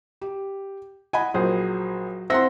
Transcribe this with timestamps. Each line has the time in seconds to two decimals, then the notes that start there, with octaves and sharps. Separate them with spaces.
0.21 G4
1.13 D#5 F#5 G#5 B5
1.34 A#1 F#3 G#4 C5
2.30 C4 C5 E5 F#5 C6 A#6